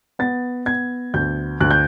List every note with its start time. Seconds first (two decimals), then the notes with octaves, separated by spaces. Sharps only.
0.19 B3 A6
0.66 B3 G#6
1.14 D2 G6
1.60 D2 F#6
1.71 G6